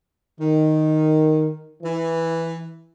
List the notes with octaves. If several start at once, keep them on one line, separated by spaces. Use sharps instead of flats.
D#3
E3